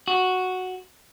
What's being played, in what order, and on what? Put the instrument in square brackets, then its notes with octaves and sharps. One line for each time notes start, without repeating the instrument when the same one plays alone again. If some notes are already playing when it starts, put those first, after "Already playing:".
[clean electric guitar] F#4